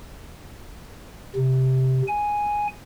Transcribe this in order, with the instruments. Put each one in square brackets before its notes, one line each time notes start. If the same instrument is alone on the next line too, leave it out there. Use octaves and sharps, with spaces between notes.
[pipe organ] C3
G#5